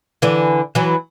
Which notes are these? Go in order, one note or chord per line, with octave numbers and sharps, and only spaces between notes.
D3 E3
E3 F#3